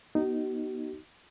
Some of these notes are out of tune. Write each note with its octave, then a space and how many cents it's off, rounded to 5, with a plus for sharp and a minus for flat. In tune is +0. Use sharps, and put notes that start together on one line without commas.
B3 -30 D#4 -5 F#4 +45